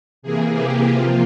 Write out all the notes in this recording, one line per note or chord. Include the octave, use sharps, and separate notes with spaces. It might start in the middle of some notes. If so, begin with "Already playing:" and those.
C3 E3 A#3 G#4
G4
C3 F3 A#3 F4